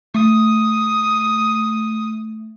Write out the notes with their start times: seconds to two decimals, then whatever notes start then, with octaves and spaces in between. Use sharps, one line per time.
0.15 A3 D#6